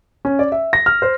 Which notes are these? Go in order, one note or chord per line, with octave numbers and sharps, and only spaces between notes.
C#4
D5
E5
A#6
F6
C5